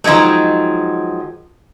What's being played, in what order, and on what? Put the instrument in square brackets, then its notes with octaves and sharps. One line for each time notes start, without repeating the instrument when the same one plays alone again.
[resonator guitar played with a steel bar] D#3 F3 F#3 G#3 A3